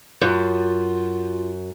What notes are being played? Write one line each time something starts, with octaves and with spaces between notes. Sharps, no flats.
F#2 F4